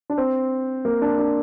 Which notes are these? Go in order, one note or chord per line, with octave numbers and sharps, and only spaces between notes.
D4
C4
A#3
D4
D4